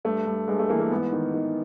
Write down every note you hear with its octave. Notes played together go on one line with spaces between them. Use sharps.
G2 A3
G2
G2 G#3
A3
E3 A#3
A#3
G#2 B3
D#3
D#3